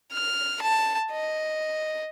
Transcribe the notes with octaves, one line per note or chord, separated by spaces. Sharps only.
F6
A5
D#5